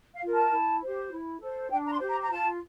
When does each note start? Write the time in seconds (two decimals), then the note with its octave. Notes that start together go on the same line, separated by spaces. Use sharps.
0.14 F5
0.23 F4 A#4
0.33 A5
0.52 E4
0.82 G4 C5
1.12 E4
1.41 A4 C5
1.70 D4 G5
1.86 A#5
1.90 C6
1.99 G4 C5
2.09 A#5
2.21 A#5
2.29 F4 A5